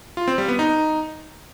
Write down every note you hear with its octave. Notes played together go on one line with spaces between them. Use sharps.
F4
C4
G3
B3
D#4